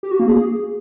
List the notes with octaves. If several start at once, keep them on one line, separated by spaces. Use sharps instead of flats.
G4
F#4
A#3
G#4